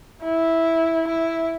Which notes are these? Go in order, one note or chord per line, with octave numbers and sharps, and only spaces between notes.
E4
E4